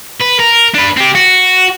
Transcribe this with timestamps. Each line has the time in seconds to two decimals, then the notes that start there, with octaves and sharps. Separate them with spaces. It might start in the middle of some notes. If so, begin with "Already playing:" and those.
0.21 B4
0.40 A#4
0.75 D4 B4
0.97 C4 G4
1.15 F#4